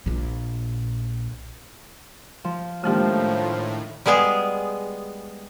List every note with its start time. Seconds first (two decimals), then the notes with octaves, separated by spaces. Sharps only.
0.06 A#1 A#2
2.44 F3
2.84 A2 D#3 F3 G#3 A#3 D4 G4 F6
4.06 G3 G#3 B3 G#4